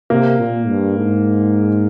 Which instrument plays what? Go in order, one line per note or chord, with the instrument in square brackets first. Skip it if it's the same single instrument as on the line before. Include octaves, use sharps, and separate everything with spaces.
[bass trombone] C3 [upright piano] A#3
[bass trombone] A#2
G2
G#2